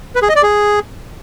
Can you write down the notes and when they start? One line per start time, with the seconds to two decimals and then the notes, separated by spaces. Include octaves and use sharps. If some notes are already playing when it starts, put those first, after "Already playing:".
0.15 B4
0.22 G#4
0.29 D#5
0.36 D5
0.43 G#4